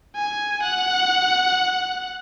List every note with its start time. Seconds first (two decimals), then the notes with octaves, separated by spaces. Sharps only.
0.15 G#5
0.62 F#5